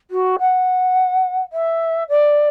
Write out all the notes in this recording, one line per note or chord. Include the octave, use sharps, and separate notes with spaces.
F#4
F#5
E5
D5